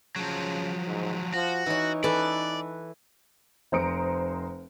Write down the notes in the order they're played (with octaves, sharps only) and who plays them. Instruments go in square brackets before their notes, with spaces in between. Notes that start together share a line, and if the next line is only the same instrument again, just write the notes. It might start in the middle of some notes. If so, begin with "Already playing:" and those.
[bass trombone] C#3 [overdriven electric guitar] F3 F#3
[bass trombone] G#2
[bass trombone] F3 [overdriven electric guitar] F#4
[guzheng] E3 C#5 [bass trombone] D#4
[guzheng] E3 A4 B4 [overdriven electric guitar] D5
[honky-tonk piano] F1 C5 A#5 D#6 C#7 D7